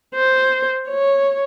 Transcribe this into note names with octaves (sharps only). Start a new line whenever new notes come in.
C5
C#5